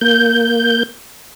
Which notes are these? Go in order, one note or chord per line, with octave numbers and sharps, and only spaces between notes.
A#3 G6